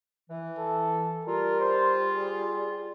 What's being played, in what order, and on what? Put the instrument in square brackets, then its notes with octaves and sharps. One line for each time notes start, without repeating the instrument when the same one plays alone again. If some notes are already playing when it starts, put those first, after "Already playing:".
[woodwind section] E3
[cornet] A4
[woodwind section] G3 F4 [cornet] A#4
[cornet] C5
G#4